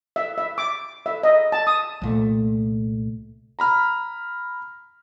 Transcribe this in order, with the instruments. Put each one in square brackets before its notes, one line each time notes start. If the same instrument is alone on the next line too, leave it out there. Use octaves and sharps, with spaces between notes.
[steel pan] E5
E5
D6
E5
D#5
A5
D#6
[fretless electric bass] C2 A#2 A3
[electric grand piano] A#5 B5 F6